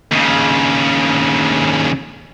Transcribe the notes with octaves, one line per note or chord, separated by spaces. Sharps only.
D#2 C#3